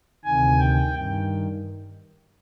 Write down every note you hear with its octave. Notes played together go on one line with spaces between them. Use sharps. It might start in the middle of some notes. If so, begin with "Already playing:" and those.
D2 C3 D#3 G#5
G5
G2 D#3